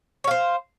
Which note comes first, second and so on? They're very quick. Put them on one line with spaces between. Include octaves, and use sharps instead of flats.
C#5 F5 C5